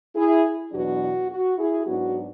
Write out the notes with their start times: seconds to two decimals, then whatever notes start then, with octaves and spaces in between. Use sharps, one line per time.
0.15 E4 G#4
0.72 E2 B2 F#3 B3 D4 F#4
1.30 F#4
1.58 E4 G#4
1.87 G#2 F#3 B3 D4 F#4